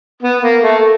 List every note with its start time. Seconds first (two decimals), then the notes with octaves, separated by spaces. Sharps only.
0.23 B3
0.42 A#3
0.63 A3